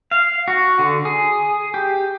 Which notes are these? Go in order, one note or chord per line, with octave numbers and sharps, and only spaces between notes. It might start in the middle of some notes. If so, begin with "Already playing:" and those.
F5
F#4
D3
G#4
G4